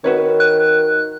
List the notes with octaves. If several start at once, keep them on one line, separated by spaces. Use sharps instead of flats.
D#3 F#4 B4 C#5
F#6